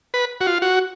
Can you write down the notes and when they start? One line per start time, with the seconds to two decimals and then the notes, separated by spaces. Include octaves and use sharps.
0.14 B4
0.41 F#4
0.47 F4
0.62 F#4